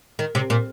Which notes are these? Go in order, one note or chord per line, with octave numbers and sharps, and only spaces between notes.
D#3
C3
A#2